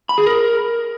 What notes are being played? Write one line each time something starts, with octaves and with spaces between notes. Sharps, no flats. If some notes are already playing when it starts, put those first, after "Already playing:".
B5
G#4
A#4